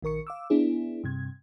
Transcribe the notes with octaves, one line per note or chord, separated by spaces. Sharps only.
A#1 D#3 A#4 C#6 C#7
F5 D6 E6
B3 D4 E4 G#4
G2 C3 G#6